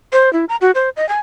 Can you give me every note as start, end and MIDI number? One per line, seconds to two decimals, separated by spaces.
0.13 0.32 72
0.33 0.45 64
0.49 0.56 82
0.61 0.71 66
0.75 0.89 72
0.97 1.07 75
1.09 1.19 80